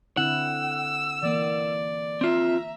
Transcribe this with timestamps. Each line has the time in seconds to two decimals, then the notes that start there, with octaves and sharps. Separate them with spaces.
0.17 D3 C4 E4 F#5 E6
1.23 E3 A#3 D5
2.21 C4 F4 E5 A#5